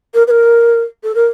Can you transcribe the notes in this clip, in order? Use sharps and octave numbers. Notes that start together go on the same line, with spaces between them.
A#4
B4
A#4
A4
A#4